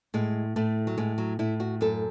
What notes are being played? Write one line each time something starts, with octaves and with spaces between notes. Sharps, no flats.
A2 G#3
A2 A3
F#3
A2 G#3
F#3
A2 E4
F#4
F#2 A4